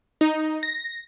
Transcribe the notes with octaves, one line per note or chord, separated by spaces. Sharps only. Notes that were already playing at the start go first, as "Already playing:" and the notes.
D#4
A#6